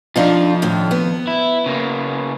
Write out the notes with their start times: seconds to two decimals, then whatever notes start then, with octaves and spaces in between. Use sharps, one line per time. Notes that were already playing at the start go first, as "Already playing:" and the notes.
0.16 F2 F3 D4 D#4 F4
0.62 A2 D3 D#3
0.91 B3
1.27 E4
1.66 C#3 A#3